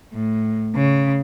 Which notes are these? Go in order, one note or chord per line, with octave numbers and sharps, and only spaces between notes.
A2
C#3